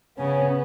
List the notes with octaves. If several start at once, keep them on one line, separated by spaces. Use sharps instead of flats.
C#3 B3 C#4